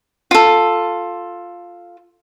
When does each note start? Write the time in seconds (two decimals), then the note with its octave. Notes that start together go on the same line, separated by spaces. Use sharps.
0.31 F4 A4